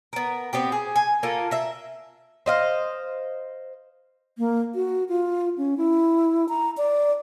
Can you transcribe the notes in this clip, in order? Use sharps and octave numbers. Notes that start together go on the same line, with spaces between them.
B3 A#4
B3 C4 G4
G#4
G#5
A#3 F4 A4 A#4
A#4 E5
C5 D#5 F5
A#3
F#4
F4
C#4
E4
A#5
D5